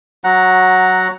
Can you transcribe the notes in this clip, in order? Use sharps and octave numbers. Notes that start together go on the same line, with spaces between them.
F#3 F#5 A#5